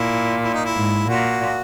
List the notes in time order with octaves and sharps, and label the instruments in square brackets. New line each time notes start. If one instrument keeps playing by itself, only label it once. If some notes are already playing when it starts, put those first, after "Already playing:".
Already playing: [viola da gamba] A#2 [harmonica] E4
[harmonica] E4
D#4
E4
[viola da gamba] G#2
[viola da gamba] A#2 [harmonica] F#4